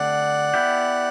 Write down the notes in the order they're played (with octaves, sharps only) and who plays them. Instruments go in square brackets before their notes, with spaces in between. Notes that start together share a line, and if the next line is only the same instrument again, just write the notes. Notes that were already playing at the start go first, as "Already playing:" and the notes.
Already playing: [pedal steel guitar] D3 A3 C4 G4 [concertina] D5 F#5
[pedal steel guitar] B3 E4 G4